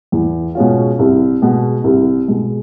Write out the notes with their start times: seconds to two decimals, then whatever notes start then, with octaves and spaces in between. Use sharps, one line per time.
0.12 E2
0.55 B2 G#3 C#4 F4
0.99 C2
1.42 B2 G#3
1.84 C2
2.28 B2 G#3